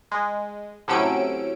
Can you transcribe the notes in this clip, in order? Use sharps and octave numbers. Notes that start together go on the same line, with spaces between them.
G#3
A2 C3 F#3 C#4 E6 D7